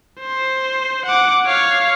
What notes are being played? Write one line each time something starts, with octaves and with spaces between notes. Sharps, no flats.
C5
F#5 D6
C#5 F5